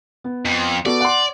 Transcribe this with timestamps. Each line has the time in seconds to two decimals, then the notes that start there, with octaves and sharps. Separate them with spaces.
0.24 B3
0.45 F2
0.86 B3 F#4 A4 D5
1.00 F#5 C6